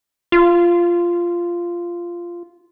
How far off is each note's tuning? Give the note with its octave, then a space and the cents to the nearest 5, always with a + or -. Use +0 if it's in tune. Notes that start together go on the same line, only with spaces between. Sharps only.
F4 -10